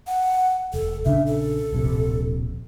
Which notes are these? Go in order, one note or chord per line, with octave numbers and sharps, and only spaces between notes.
F#5
E1 A4
A#1 C#3 D4 E5
A4
D1 A#1 C3